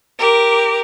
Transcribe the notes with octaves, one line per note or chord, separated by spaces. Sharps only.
G4 A#4